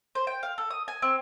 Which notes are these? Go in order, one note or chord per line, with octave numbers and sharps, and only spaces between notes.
C5
G5
F5
A4
D#6
G#5
C4